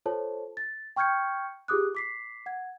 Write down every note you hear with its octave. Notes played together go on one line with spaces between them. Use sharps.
F4 A4 C5 C#5 A5
A6
G5 C#6 F6 G6 G#6 C#7
F4 G4 G#4 D6 D#6 F#6
D6 B6 C7
F#5 G#6